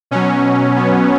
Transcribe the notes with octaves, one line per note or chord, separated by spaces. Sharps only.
B2 F#3 C#4
B3